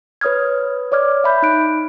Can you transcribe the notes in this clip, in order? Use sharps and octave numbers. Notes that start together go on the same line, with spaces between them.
B4 C#5 D#6 F6 G#6
C#5 D5 D6 F6 G#6
E5 B5 G6
D#4 F#6 D7